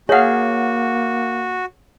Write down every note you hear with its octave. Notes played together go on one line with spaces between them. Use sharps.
A#3 F#4 G#4 C#5 F5 F#5